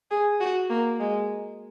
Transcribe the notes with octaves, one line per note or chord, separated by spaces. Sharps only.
G#4
F#4
A#3
G#3